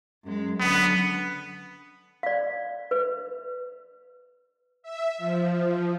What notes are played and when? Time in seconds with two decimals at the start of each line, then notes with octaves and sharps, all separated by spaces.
0.24 F#2 G#3
0.60 D3 F#3 B3
2.23 D5 F5
2.91 B4
4.82 E5
5.18 F3